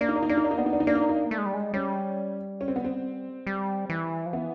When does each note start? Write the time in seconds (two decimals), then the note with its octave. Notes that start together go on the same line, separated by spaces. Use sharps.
0.01 A#3 D4
0.09 D#4
0.16 D4
0.22 D#4
0.29 A#3 D4
0.37 D#4
0.44 D4
0.51 D#4
0.58 B3 D4
0.66 D#4
0.73 D4
0.80 D#4
0.87 A#3 D4
0.95 D#4
1.01 D4
1.09 D#4
1.16 D4
1.31 A3
1.38 G#3
1.46 G3
1.54 G#3
1.74 G3 C#4
2.61 C#4
2.68 C4
2.76 B3
2.84 C4
3.47 G3
3.90 E3
4.26 F3
4.33 E3 B3